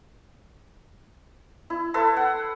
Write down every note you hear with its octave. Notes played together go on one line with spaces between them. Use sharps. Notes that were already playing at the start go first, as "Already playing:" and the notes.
E4
A4 B4 E5 C6
F#5